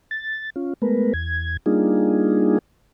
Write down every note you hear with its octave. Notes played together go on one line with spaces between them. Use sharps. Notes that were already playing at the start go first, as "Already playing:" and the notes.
A6
C#4 F4
G#3 A3 B3 A#4 B4
E2 G#6
G3 A#3 D4 D#4 F4 G#4